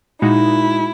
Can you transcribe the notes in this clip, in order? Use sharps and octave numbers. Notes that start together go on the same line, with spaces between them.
A#2 G#3 D#4 E4 F#4